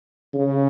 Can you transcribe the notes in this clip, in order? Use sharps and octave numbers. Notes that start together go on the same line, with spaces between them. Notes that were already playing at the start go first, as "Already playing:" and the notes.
C#3